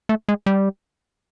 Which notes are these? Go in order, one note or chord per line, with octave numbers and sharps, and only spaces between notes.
A3
G#3
G3